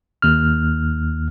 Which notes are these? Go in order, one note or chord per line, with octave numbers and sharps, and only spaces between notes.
D#2 F6